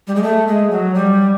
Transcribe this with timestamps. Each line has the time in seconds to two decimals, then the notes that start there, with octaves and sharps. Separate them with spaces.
0.07 G3
0.15 G#3
0.23 A3
0.47 G#3
0.70 F#3
0.95 G3